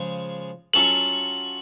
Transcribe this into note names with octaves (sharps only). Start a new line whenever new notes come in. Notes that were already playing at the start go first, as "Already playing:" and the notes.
Already playing: C#3 F3 G#3 G#4
F#3 C#4 F4 A4 F#7